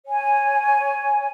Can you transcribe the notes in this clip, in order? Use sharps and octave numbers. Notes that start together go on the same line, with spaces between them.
C#5 G#5